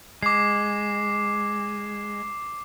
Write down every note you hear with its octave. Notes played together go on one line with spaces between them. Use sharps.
G#3 D6 C7